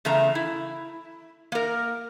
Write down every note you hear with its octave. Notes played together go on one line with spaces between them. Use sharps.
E2 C#3 A3 A#5
E4
A#3 A#4